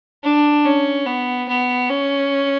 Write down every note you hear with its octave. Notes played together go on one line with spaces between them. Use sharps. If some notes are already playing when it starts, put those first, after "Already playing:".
D4
C#4
B3
B3
C#4